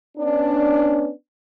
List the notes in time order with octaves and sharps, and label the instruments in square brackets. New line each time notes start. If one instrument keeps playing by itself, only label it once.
[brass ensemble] B3 C#4 D4